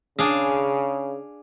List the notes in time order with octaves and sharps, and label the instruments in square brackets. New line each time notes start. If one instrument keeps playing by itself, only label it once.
[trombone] C#3 [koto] D4 G#4 F5